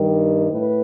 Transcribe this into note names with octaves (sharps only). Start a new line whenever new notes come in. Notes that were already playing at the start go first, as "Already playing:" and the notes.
Already playing: G2 D#3 G3
A2 B4